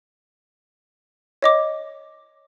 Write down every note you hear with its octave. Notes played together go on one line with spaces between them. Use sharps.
C#5 D#5 D6